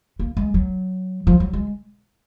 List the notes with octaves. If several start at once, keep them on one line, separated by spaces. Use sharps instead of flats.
A#3
G#3
F#3
F3
F#3
G#3